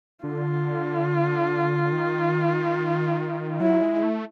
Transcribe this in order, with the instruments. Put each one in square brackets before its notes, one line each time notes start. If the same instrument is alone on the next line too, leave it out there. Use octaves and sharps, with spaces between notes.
[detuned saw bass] D3 [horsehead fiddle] F4
[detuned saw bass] D#3
[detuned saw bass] F#3 [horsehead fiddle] E4
[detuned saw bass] G#3
A3